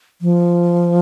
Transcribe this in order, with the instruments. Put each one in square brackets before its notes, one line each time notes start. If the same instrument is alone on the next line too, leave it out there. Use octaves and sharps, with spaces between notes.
[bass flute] F3